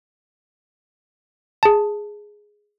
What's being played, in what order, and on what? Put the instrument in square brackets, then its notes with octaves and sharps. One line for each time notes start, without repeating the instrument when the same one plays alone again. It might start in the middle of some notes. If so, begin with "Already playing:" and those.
[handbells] G#4 A5